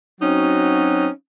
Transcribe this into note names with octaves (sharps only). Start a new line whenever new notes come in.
F#3 C4 C#4 D#4 F#4